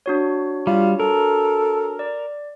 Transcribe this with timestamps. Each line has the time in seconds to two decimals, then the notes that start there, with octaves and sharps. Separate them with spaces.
0.06 D4 F#4 C#5
0.67 G3 F4
1.00 A4 A#4
1.99 D5